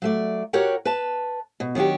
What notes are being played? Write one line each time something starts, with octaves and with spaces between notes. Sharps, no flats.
F#3 A3 D5
F#4 G4 A#4 C#5 F#5 G5
B4 A5
B2
D#3 F#3 D4 F#4 G4